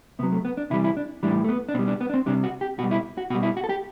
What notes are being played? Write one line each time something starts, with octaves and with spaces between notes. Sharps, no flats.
C3 F#3 B3
A3
B3
D4
C3 E3 G3 E4
E4
D4
A2 E3 G3 D4
A3
B3
D4
B2 G3 C4
D4
B3
D4
C4
C3 G3 D4
F#4
G4
B2 G3 F#4
E4
F#4
B2 G3 F#4
E4
F#4
A4
G4